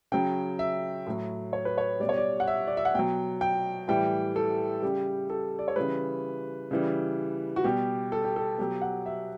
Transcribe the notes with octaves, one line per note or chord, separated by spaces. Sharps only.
C#3 F#3 G5
E5
A2 F#3
C#5
B4
C#5
B2 G3 D5
C#5
D5
F#5
E5
D5
E5
F#5
B2 F#3 G5
G5
A2 E3 G3 G5
A4
C#3 G3 G4
A4
D5
C#5
C#3 E3 G3 B4
C#3 E3 G3
F#4
B2 G3 G4
A4
G4
A4
B2 F#3 G4
F#5
E5